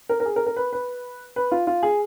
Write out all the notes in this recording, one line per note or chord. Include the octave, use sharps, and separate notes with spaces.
A#4
A#4
G#4
A#4
A#4
B4
B4
B4
F4
F4
G#4